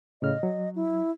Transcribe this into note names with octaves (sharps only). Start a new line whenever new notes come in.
A2 C#3 D#5 F6
F#3
E4